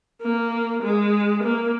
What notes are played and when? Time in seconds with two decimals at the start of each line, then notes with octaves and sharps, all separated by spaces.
0.23 A#3
0.83 G#3
1.43 A#3